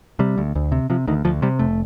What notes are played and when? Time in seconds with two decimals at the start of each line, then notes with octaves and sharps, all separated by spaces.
0.19 C3 G3
0.38 D2
0.55 D2
0.72 C3
0.90 C3 F3
1.08 D2 D#3
1.25 D2 F3
1.42 C3 G3
1.59 F1 A3